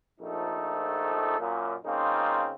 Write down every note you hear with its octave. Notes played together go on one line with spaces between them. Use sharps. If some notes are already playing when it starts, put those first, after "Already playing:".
A#1 F3 A3 D#4 A4
F#2 A#2
C#3 A#3 C4 D#4 F4